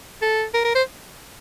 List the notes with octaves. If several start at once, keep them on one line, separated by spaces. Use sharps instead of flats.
A4
A#4
A#4
C5